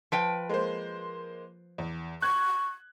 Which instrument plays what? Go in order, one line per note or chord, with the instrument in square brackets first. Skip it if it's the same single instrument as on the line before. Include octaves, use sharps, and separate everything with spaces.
[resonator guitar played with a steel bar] F3 B4 G5
[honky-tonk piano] G#3 A#3 C5
E2
[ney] C#6 [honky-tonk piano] F#6 G#6